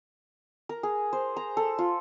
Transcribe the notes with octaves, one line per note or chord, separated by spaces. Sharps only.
A#4
G#4
C5
A#5
A4
F4